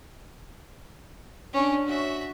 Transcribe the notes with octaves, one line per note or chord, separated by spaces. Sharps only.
C#4 D4
F#4 E5